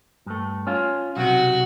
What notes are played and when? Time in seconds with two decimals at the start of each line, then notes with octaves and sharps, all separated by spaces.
0.26 G2 A3
0.67 C#4 F4
1.17 B1 A2 C3 F#4